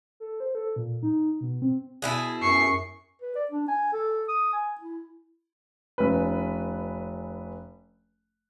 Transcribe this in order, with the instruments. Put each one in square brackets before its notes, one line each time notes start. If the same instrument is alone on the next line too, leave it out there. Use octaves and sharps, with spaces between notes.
[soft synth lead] A4
C5
A4
A#2
D#4
B2
C4
[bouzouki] B2 E4 G#4
[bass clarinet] F#2 [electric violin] C#6 C7
[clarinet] B4
D5
D4
G#5
A4
D#6
G#5
E4
[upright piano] F1 C#4 B4